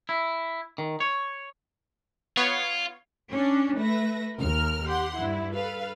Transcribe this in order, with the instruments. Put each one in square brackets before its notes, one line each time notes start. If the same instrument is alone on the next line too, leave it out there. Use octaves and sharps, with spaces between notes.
[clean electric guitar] E4
D#3
C#5
[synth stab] B3 C#5 [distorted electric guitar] F4
[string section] C#4 D4
A3 B4 E5 A#6
D#2 A#4 F6
G4 F#5 C6
G2 E4
A4 B4 F5